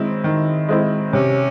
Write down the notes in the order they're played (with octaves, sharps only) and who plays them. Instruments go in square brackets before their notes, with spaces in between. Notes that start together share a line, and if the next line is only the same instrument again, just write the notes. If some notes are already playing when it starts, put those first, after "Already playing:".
Already playing: [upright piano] D#3 G#3 C4 E4
D#3
G#3 C4 E4
[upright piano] C3 [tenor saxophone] C#4